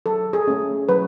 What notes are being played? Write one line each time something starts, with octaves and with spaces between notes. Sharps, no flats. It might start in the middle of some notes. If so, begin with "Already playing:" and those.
F#3 A4
G#4
A3 C#4
F#3 B4